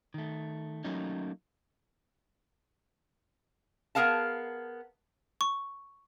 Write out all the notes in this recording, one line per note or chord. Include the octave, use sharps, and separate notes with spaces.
D#3 A3
F#3 A3 A#3 C#4 D#4
B3 G#4 A#4 F5 A5
C#6